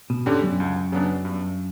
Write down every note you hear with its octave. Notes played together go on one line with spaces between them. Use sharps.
B2
G2 D3 G3 C#4 G4
F#2
C#2
C#3 F#3 B3 D4
G2